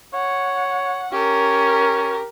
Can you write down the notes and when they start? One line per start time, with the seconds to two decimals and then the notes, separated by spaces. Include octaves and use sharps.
0.13 C#5 F#5
1.12 C#4 G4 A#4